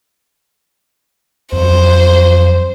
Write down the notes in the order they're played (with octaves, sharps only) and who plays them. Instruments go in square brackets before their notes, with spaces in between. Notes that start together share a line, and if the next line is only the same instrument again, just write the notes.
[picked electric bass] F2 F#3 [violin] C5